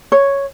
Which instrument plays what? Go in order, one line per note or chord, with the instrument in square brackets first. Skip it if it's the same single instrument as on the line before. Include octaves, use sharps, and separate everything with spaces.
[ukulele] C#5